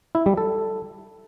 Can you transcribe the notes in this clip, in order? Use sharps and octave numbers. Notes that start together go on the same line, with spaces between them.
E4
G3
A4